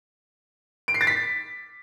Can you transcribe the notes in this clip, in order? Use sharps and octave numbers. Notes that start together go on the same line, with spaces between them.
D7
C7
A6
B6